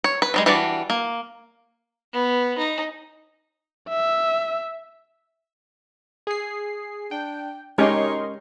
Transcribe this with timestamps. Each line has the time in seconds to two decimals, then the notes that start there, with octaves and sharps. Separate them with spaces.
0.04 C#5
0.22 B4
0.34 F3 G3 G#3
0.46 E3 G3 D4 F#4 D5
0.90 A#3
2.13 B3
2.57 D#4
3.89 E5
6.27 G#4 C7
7.11 D4 G5
7.78 G#3 C#4 D#4 G4 A#4 C#5 D#5 C6